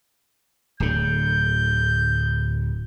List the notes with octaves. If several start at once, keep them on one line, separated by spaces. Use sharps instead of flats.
D1 D3 G6